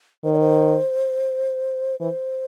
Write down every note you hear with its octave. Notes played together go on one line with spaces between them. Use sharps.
D#3 C5
C#5
C5
E3 C5